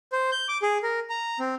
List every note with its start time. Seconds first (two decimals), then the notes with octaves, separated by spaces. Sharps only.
0.12 C5
0.31 G6
0.48 D6
0.62 G#4
0.83 A#4
1.10 A#5
1.40 C4